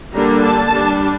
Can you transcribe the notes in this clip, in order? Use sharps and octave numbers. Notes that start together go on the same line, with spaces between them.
D3 G3 A#3 D4 A#5
A5
G3 D4